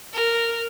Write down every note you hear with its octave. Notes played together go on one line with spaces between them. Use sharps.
A#4